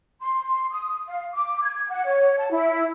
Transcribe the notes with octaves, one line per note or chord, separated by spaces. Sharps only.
C6
D#6
F5
D6
G#6
F#5
C#5
A5
E4